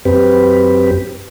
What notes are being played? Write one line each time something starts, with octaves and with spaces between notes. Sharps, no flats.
F#2 C4 G4 B4